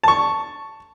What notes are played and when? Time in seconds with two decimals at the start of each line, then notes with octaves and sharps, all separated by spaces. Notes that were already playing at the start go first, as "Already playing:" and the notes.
0.04 A5 C#6